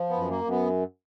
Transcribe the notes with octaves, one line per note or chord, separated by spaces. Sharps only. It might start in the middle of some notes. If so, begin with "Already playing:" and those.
Already playing: F3
B3
F#2
A#3
F#2
B3